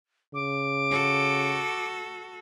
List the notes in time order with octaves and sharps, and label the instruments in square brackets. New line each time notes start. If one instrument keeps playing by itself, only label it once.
[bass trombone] C#3 [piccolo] D6
[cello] F#4 A4